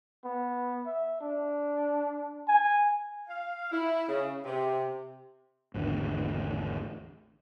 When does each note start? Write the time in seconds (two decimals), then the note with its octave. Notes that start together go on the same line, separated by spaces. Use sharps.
0.24 B3
0.86 E5
1.21 D4
2.48 G#5
3.27 F5
3.71 E4
4.09 C#3
4.45 C3
5.74 G#1 E2 A2 D3